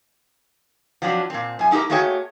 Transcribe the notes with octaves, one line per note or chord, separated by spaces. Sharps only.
F3 F#3 C4 D4
A#2 C4
F#2 G#5
A3 D#4 F#4 G4 A#4
A3 A#3 F#4 G#4 C#5 G5